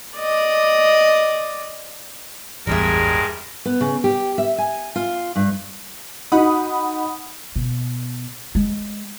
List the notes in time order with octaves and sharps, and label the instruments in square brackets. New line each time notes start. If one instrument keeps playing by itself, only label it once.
[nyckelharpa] D5 D#5
[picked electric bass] A1 E2 [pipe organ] G2 G#3 [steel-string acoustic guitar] G3 G#4 E5 [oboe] A#4
[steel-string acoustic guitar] B3
C#3
G4
E5
G#5
F4
G2
[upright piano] D#4 F#4 [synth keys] F#5 B5 D#6
[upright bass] B2
G#3